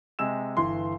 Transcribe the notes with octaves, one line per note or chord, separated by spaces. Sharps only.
C3 G#3 G#5 E6 E7
G1 E3 C6